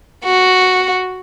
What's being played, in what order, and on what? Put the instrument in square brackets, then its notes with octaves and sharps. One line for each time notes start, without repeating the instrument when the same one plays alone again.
[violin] F#4